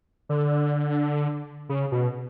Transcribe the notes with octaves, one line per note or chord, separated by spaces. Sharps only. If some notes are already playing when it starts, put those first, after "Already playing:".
D3
C#3
B2